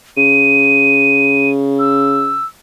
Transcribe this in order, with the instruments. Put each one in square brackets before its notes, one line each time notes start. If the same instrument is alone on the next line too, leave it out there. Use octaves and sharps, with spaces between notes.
[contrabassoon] C#3 [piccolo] D#7
[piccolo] E6